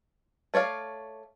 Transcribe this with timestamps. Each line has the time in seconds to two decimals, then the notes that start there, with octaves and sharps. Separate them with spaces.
0.54 A3 C#5 D5 F5